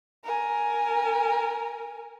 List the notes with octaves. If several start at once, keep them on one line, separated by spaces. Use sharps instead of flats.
A#4 G#5